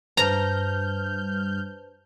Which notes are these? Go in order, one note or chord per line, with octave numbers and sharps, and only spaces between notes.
G2 B4 C5 A5 A#5 F6 G6